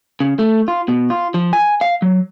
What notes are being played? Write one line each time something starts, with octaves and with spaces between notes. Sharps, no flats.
C#3
A3
F4
B2
F4
F3
G#5
F5
F#3